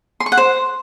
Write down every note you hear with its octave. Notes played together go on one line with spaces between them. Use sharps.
C6
C#6
F#5
C5